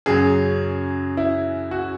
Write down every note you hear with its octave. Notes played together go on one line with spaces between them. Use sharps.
F#2 C#3 F#3 G#4
E4
F#4